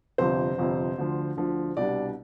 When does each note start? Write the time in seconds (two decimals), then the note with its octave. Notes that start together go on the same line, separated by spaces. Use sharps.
0.18 G1 F2 C3 C5
0.58 G1 F2 C3
0.98 D2 D3 F3
1.37 D2 D3 F3
1.77 C2 B2 G3 D4 D5